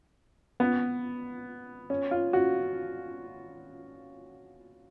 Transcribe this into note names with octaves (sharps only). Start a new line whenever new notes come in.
B3
C#4
F4
F#4